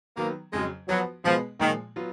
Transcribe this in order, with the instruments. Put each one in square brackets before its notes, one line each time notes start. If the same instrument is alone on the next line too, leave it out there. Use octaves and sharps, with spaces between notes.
[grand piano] D#3 F#3 B3 [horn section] A#3
[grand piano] F2 C#3 F#3 [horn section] G#3
[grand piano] F3 B3 F#4 B4 [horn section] F#3
[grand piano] B2 G#3 B3 [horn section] F3
[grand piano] A#2 F3 G#3 [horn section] D#3
[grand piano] F#3 B3 F4